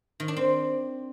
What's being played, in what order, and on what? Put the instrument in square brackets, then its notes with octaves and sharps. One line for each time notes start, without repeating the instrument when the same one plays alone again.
[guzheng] D#3
D4
C4